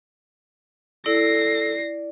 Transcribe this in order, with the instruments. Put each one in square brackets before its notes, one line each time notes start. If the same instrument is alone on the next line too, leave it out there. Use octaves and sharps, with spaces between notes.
[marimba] E4 [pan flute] A4 [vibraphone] D5 [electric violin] A#6 C7